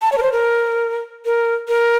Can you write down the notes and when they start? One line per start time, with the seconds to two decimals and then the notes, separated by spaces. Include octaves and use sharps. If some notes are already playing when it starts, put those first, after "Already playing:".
0.02 A5
0.12 C#5
0.18 A#4
0.22 C5
0.32 A#4
1.25 A#4
1.68 A#4